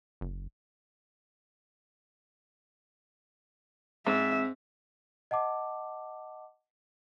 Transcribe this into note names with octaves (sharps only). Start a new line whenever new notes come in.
F#1
G#2 C4 E5
D#5 F#5 A5 D6